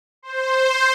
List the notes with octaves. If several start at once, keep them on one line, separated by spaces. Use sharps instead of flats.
C5